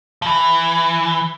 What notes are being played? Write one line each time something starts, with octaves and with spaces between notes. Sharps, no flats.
F3
E3